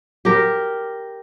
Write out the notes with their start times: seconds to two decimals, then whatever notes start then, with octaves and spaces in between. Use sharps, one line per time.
0.25 G4 A#4